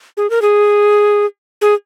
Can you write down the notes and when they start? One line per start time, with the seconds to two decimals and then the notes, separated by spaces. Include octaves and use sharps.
0.17 G#4
0.30 A#4
0.42 G#4
1.61 G#4